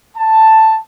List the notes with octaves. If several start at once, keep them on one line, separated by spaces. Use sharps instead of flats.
A5